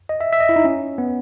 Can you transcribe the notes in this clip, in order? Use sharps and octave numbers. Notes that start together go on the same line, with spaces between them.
D#5
E5
E5
D#5
E4
D#4
C#4
B3